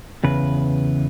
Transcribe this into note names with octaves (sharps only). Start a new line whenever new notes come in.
E2 C#3 B4